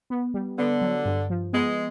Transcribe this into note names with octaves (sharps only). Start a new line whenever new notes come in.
B3
G3
D3 B3
F#3
G2
F3
G#3 B3